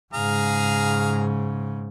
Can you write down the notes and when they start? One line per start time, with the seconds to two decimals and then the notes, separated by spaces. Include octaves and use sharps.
0.14 G#2 C#3 G#4 F5 A#5